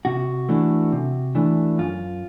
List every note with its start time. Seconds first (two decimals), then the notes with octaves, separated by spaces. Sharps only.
0.05 C3 F#4
0.49 E3 A3 D4
0.92 C3
1.35 E3 A3 D4
1.78 F#2 F4